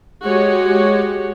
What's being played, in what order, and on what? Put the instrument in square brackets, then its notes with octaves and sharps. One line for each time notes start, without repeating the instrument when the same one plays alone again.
[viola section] G#3 F#4 G4 C#5